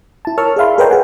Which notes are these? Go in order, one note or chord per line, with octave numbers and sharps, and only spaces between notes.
E4 A5
A#4 C#5 A5 C#6 E6 F6
G#4 D5 E5 F5 B5 C6
G#4 A#4 B4 C#5 D#5 G5
G#4 F#5 G#5